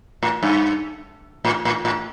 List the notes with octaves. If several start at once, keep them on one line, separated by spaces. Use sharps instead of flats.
A2
G2
A2
A2
A2